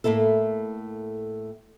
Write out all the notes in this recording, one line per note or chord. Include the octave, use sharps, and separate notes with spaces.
A2 A3 A#3 E4 A4